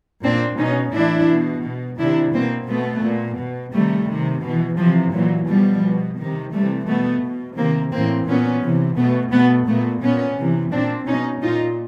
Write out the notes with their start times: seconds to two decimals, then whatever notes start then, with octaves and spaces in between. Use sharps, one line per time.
0.23 A#2 C4 D4
0.58 B2 C#4 D#4
0.93 A2 E3 D4 E4
1.29 B2
1.63 B2
1.98 C3 D#3 D4 E4
2.33 B2 A#3 C4
2.68 B2 A3 B3
3.03 A#2
3.38 B2
3.73 C3 D#3 G3 A3
4.08 C3 D#3
4.42 B2 E3
4.77 C3 E3 F3
5.12 A#2 E3 F#3
5.48 B2 F3 G3
5.83 B2
6.18 C3 D#3
6.53 C3 E3 G3 A3
6.87 B2 A3 B3
7.23 B2
7.57 C3 D#3 A#3 C4
7.92 A2 E3 A#3 C4
8.27 A#2 B3 C#4
8.62 C3 E3
8.97 B2 A3 B3
9.32 B2 A3 B3
9.67 A#2 A3 B3
10.02 A#2 B3 C#4
10.37 C3 E3
10.72 A#2 C4 D4
11.07 B2 C#4 D#4
11.42 A#2 D#4 F4